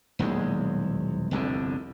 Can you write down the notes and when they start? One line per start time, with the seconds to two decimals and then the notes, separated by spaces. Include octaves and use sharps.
0.19 D#1 B1 E2 G#3
1.31 G1 C2 F2 D3